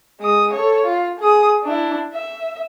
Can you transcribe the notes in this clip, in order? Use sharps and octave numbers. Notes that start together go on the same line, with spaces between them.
G#3 D#6
A4 C#5
F4
G#4 D#6
D4 E4
E5